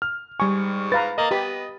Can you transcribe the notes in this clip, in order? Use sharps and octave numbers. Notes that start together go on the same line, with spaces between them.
F6
G#2 G3 G#5 C#6
B4 F5 A#5 A6
A#3 D#5
B3 G4 B5